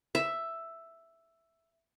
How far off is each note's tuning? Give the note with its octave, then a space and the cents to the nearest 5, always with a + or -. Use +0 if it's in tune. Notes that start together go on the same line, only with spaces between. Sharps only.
E5 +5